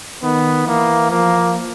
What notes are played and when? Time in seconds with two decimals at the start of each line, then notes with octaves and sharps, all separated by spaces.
0.23 D#3 B3
0.67 E3 A#3
1.10 F3 A#3